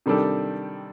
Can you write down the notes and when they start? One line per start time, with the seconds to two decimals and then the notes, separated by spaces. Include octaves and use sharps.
0.06 C3 D#3 G3 D4 A4